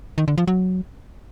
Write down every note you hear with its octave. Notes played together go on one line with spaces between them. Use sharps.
D#3
D3
F3
F#3